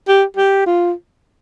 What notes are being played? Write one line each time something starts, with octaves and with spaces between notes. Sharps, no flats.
G4
G4
F4